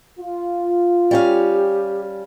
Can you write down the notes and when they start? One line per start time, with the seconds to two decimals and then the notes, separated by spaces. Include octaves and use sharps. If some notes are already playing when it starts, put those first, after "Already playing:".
0.19 F4
1.11 G3 C#4 G4 F5